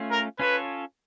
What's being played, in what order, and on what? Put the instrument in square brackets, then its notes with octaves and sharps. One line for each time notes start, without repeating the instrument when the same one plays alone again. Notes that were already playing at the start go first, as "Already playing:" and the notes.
Already playing: [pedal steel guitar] A3 C#4 F4
[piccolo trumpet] A#4
[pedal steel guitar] C#4 F4 A4 C#5 [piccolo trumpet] B4